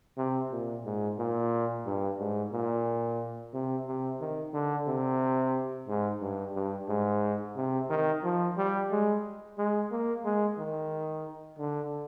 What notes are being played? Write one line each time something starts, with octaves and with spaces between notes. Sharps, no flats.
C3
A#2
G#2
A#2
G2
G#2
A#2
C3
C3
D#3
D3
C3
G#2
G2
G2
G#2
C3
D#3
F3
G3
G#3
G#3
A#3
G#3
D#3
D3